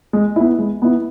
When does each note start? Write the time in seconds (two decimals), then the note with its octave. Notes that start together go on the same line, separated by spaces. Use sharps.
0.13 G#3
0.36 B3 E4
0.59 G#3
0.82 B3 E4